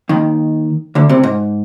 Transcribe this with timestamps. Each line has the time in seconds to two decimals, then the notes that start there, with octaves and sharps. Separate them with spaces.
0.09 D#2 D#3
0.95 D2 D3
1.09 C2 C3
1.23 G#2